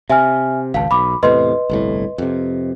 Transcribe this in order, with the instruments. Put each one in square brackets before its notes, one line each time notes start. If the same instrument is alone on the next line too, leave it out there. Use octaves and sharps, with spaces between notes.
[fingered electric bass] C3 [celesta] E5 G#5 F6
[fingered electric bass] G#1 C#2 [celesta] F5 A5
[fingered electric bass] B1 [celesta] B5 D6
[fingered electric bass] E2 A2 C3 [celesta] B4 D#5 C6
[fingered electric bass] G1 C2 A2
F2 C3